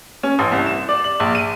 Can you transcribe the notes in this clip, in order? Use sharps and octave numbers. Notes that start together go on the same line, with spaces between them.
C#4
A1
C2
E7
D5
F#7
A#1
D#7